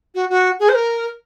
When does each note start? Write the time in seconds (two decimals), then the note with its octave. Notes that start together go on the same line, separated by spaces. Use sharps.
0.15 F#4
0.30 F#4
0.60 G#4
0.69 C5
0.75 A#4